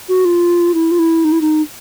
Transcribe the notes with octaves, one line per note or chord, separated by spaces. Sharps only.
F#4
F4
E4
F4
E4
D#4
E4
D#4